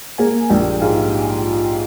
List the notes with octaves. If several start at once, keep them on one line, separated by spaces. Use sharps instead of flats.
A#3 G#4 G#5
A#1 G4 G5
G#2 F4 F5